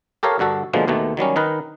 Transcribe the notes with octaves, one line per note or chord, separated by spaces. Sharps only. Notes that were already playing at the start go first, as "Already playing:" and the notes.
G4 A4 A#4 C#5 F5
G2 D3 F#4 A4
B2 D3 F3 G#3 A#3
D#2 B2 D#3 A3
D#3 F#3 G3 C#4
D#3 D#4 A#4 B4